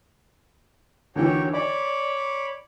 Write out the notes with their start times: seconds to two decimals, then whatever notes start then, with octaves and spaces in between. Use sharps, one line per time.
1.16 D#2 D3 E3 F#4 G4 C#5
1.54 C#5 D5 B5 D6